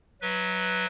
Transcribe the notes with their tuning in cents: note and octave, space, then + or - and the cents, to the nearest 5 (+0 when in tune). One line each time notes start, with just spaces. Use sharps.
F#3 +0 B4 +0 E5 -40